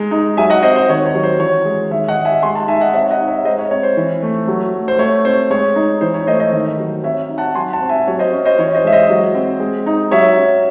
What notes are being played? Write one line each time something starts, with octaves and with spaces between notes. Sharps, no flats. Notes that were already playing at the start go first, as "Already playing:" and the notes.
Already playing: G#3 D#4
D#4
F#3 E5 G#5
D#5 F#5
C4 C5 D#5
C5
D#3 C#5
C#5
F#3
C5
E3 C#5
G#3
D#3 C#5 E5
D#5 F#5
G#3
E5 G#5
G#3 G#5 C6
F#5 A5
D#4 E5 G#5
D#5 F#5
C4 C#5 E5
D#5 F#5
D#4
C#5 E5
G#3 C5 D#5
C#5
C4 C#5
C5
E3
A3
F#3
A3
C5
A3 C#5
C4 C5
G#3 C#5
D#4
E3 C5
C#5
A3 C5 D#5
C5 D#5
D#3
F#3
C4 C#5 E5
D#4
F#5 A5
F#3 G#5 C6
F#5 A5
C4
E5 G#5
F#3 C#5
C5 D#5
C#4
C5 D#5
E3 C#5
C5 D#5
G#3 E5
C5 D#5
F#3
C4
G#3
D#4
F#3 C#5 E5
C#4